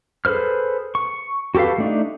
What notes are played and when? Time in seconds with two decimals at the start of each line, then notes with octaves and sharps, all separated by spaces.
0.25 G#4 A4 B4 C5 F6
0.95 C#6
1.55 F#4 G4 A4 B4 F5
1.78 A3 D4 D#4